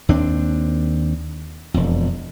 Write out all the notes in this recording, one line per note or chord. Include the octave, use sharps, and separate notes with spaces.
D#2 C4 D4
E1 F2